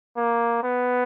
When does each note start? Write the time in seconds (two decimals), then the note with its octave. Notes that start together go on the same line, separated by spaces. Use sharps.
0.17 A#3
0.63 B3